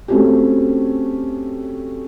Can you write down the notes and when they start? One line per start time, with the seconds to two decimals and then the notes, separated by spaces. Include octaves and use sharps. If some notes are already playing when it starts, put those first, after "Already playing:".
0.08 A3 C4 C#4 F#4 G4